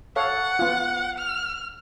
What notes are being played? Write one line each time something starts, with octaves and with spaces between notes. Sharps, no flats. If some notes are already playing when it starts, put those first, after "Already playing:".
A4 C#5 F5 F#5
B3 F4
F6